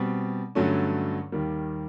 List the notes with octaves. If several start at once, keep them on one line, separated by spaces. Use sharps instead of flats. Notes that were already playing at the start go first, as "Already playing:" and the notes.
Already playing: B2 G3 C4
G2 D3 F#3 A3 C#4
D#2 D#3 G3 A#3